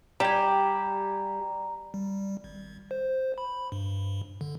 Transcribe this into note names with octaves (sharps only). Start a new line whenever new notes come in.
G3 G4 G#5 A#5
G3
G#1
C5
B5
G2
D3